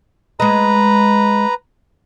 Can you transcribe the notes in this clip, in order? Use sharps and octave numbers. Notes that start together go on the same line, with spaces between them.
G#3 B4 D#5 A#5